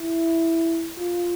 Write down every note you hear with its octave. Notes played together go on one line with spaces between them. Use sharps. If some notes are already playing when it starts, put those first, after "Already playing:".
Already playing: E4
F4